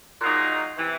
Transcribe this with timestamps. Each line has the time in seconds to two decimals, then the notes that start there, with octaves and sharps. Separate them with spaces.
0.21 A#2 F#3 A#3 D#4 G#4
0.77 C3 E3